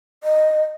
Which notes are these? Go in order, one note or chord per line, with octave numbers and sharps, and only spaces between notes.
D#5